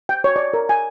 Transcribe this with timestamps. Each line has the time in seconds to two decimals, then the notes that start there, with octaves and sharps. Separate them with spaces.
0.09 G5
0.24 C#5
0.36 D5
0.54 A#4
0.69 G#5